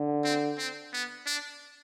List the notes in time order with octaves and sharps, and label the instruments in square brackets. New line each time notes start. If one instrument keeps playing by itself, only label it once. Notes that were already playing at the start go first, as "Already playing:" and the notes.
Already playing: [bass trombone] D3
[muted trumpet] C4
C4
B3
D4